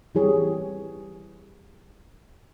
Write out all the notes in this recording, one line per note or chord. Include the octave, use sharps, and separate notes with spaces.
E3 G3 E4 G4 G#4 C#5